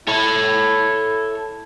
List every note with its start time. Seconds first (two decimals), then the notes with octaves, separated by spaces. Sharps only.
0.08 E4 A4 C#5